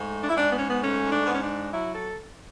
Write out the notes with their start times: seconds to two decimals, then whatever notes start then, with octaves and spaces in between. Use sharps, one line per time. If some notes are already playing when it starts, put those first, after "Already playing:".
Already playing: G#2 A3
0.21 D4
0.29 E4
0.36 G#2 D4
0.51 B3
0.58 C#4
0.68 B3
0.81 A3 C#4
1.11 D4
1.26 G#2 B3
1.33 C#4
1.41 D4
1.72 F#3 E4
1.94 A4